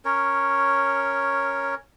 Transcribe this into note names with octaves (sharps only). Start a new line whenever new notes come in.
C#4 A#4 C#5